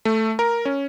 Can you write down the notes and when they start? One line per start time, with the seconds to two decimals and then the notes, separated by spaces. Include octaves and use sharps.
0.05 A3
0.39 A#4
0.65 C#4